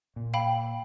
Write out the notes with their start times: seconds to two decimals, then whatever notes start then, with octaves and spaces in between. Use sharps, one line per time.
0.16 A#2
0.34 F5 G5 B5